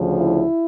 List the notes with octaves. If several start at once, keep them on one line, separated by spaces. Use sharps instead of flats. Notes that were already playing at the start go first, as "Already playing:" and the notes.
Already playing: D2 C#3 F3
E4